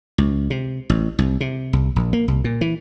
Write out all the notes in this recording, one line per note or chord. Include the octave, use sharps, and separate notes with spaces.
C#2
C3
A1
C2
C3
C2
A#1
A#3
C2
A#2
E3